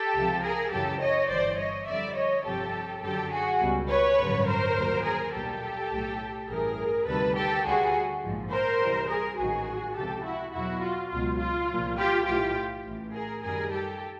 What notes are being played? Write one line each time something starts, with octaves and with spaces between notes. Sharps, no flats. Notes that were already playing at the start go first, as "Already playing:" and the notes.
Already playing: G4 A4
C#2 C3 F3
G#4 A#4
F#2 C#3 E3 G4 A4
C#5 D#5
G1 G2 E3 C5 D5
C#5 D#5
F2 D3 G3 D5 E5
C#5 D#5
G1 F2 C3 F3 G4 A4
F#2 D3 F#3 G4 A4
F#4 G#4
C#2 B2 G3
B4 C#5
A1 G2 D3 F#3
A#4 C5
D#2 D3 F#3
G#4 A#4
B1 A#2 G3 G4 A4
B1 A2 F#3
A1 G2 E3 G#4 A#4
D2 C3 D#3 G3 A4 B4
G4 A4
D2 D3 G3 F#4 G#4
A#1 G#2 F3
A#4 C5
C2 C3 E3 G3
G#4 A#4
A1 G#2 D#3 F#3 F#4 G#4
C#2 C3 F3 G4 A4
E4 F#4
E2 B2 F#3 E4 F#4
F4
C#2 B2 F#3 F4
F4
C2 A#2 F3
F4 G4
B1 A2 E3 F4 G4
A1 A2 E3
G#4 A#4
F#2 D#3 G3 G#4 A#4
G4 A4